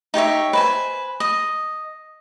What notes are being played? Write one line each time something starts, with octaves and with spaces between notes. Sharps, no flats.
D#4 G4 C#5 E5
B4 C5 G#5
D#5